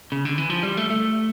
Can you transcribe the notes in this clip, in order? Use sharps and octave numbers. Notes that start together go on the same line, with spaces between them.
C#3
D3
E3
F3
G3
A3
A3